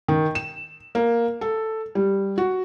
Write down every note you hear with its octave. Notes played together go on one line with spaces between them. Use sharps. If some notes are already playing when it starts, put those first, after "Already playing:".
D#3
E7
A#3
A4
G3
F#4